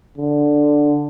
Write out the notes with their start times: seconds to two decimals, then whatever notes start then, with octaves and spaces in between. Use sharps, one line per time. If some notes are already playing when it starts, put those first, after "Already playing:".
0.18 D3